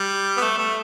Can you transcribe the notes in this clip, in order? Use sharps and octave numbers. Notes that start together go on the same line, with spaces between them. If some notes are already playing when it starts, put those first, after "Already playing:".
Already playing: G3
B3
A3
A3